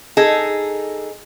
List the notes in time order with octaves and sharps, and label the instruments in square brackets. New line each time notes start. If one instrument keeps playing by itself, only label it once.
[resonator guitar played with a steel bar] D#4 G#4 A4